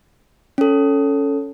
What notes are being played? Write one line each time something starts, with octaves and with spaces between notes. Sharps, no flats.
C#4 A4